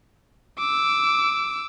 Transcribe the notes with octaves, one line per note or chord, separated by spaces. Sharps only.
D6 E6